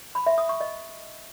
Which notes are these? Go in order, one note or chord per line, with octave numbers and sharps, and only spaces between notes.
B5
E5
D#6
C#6
D#5